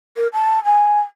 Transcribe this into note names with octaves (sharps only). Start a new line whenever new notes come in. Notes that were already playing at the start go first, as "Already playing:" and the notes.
A#4
A5
G#5